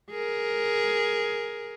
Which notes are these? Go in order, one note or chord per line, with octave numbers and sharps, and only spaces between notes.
G#4 A#4